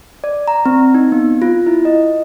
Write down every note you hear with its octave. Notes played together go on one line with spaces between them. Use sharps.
D5
A#5
C4
D#4
B3
F4
E4
D#5